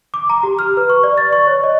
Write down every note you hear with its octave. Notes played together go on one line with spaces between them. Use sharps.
D6
A#5
G4
F6
B4
C#6
D5
A6
C#6
C#5
D#5